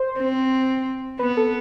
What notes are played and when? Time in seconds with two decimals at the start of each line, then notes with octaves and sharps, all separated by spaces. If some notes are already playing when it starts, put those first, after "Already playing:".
Already playing: C5
0.18 C4
1.19 B3 B4
1.37 A4